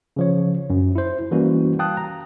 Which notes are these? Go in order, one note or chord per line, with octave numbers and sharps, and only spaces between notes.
C#3 F3 C#5
F#2
E4 C5
E3 G3 A#3 C#4 F#4
F5 G5 A5 D#6 F#6
A#5